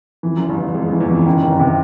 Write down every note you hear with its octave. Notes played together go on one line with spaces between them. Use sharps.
F2 E3
F#1 F#2 E3
G1 G2
E3
F2 G#3
F2 E3
E2
F2 E3
F#1 F#2 D#3
G1 G2 D#3
F#1 F#2
C3